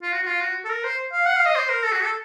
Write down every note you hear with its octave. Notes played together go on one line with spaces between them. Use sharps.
F4
F#4
F#4
F4
F#4
A4
A#4
C5
F5
F#5
F5
D#5
C5
A#4
A4
F#4
A4